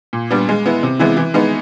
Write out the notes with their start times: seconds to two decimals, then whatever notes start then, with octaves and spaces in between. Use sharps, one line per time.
0.13 A#2
0.31 G3 B3 D4
0.49 G#3
0.66 B3 E4
0.83 C3
0.99 E3 G#3 B3 E4
1.17 E3
1.34 G#3 B3 D#4